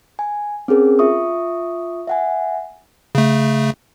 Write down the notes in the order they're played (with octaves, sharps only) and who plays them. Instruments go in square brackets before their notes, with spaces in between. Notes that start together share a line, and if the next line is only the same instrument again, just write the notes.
[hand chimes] G#5
C4 C#4 G#4 A#4
F4 E5 C#6 D#6
E5 F#5 G#5
[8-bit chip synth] C#3 A3